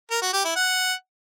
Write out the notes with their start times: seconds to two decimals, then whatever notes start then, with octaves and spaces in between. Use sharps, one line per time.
0.11 A#4
0.22 F#4
0.33 G4
0.45 E4
0.56 F#5